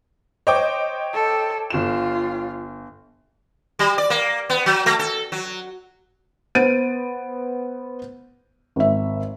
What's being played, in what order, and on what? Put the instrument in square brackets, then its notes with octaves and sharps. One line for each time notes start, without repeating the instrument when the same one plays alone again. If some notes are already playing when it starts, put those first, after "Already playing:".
[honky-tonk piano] C5 D#5 [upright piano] C#5 G5 D6
[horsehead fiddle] A4
[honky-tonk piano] G1 E7 [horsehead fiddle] F4
[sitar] G3
D5
A#3
B3
F#3
A3
A4
F#3
[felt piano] B3 C5 A6 D7 D#7
G#1 E5